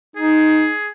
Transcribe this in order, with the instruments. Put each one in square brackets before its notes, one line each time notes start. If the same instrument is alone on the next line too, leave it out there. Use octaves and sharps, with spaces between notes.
[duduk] D#4 [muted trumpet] G#4